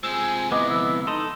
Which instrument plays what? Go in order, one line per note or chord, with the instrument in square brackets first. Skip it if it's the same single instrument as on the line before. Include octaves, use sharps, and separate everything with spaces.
[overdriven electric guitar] C3 G#3 [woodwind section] F4 C5 G#5 [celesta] E6 E7
[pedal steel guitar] B3 E4 [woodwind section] D#5 [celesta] D6
[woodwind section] D3 F3 E6
[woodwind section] D#4 [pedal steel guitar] A4 D#5 [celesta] C6